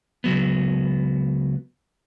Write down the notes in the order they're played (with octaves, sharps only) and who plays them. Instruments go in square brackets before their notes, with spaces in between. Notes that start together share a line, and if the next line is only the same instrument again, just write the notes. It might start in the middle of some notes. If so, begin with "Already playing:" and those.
[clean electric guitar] C#2 F#3 B3